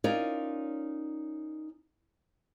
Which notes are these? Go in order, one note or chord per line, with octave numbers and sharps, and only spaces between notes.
C#4 D#4 F4 A#4 C#5 D5